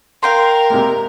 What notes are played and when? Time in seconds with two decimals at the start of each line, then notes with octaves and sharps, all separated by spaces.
0.23 A#4 F5 G5 A#5 C6
0.70 C3 G#3 A#3